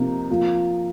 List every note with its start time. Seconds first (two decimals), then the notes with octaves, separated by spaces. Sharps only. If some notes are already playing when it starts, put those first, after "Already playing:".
Already playing: C3 F3 A#3 D#4
0.30 F3 A#3 F4